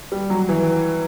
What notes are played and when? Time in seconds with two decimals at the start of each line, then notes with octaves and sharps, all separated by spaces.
0.12 G3
0.30 F#3
0.49 E3